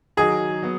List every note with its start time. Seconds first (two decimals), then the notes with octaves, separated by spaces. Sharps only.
0.17 D#3 F#3 D#4 F#4 G#4 D#5
0.62 F#3 B3